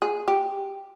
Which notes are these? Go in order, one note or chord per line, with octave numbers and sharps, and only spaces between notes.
G#4
G4